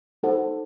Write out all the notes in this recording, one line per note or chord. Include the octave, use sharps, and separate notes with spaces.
D#4 A4 C5 F#5